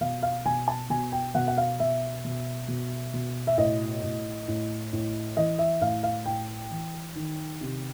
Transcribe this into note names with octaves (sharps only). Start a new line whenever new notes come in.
B2 F5
F5
B2 G#5
A5
B2 G#5
G5
B2 F#5
F#5
F5
B2 E5
B2
B2
B2
E5
A2 D#5
A2
A2
A2
E3 D#5
E5
A2 F5
F5
A2 G5
E3
D#3
C3